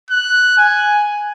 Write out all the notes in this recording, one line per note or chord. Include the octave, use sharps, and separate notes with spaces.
F#6
G#5